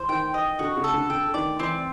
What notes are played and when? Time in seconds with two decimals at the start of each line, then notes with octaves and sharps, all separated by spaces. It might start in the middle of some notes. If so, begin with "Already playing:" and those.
Already playing: E3 C5
0.09 D#3 G5
0.34 D#5
0.59 D3 F#4
0.77 C#3
0.84 A4
0.93 D3
1.10 D3 G5
1.34 D#3 D5
1.59 E3 C4